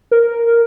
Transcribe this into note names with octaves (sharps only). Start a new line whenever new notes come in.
A#4